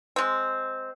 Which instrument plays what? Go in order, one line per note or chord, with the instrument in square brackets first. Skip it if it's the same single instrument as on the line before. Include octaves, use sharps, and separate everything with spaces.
[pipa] G#3 C4